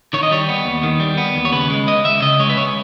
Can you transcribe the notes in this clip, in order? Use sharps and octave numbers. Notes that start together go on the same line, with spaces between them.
D#3 C#5
D#5
G3 C#5
B3
D#2
D#3
G3
B3
D#2
C#5
C#3 B4
G#3
C#2 D#5
C#2 E5
C#3 D#5
G#3 C#5
B4
C#2 C#5